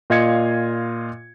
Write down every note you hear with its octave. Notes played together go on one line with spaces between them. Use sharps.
A#2 F4 D#5 F5 G#6 C#7